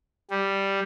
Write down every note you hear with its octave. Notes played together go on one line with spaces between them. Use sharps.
G3